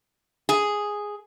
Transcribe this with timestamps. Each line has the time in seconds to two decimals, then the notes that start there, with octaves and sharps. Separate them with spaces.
0.49 G#4